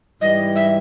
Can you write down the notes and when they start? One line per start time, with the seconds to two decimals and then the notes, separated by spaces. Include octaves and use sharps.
0.21 G#2 E3 G3 D#5
0.56 E5